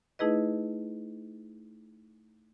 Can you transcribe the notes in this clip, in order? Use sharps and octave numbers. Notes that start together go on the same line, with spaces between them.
A3 D#4 E4 G#4 B4 D#5